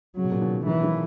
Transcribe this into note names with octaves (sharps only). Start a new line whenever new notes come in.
C#3 F#3
B2
A#2 C#3
B2 D#3
D#3 E3 F#3
D#3 F#3